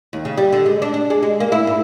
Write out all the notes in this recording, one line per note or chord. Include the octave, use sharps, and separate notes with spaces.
D#2
C#3
G3
D3
G#3
D4
D4
G#3
G#3
A#3
E4
G#2